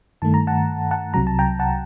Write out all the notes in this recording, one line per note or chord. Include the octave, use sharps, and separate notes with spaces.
G2 D#3 A3 A5
A#5
F#5 A5
F#5 A5
C2 C3 F#3 A#5
A5
G5 A#5
F#5 A5